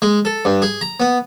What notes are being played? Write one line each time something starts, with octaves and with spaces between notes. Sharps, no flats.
G#3
A4
G2
G#4
A#5
B3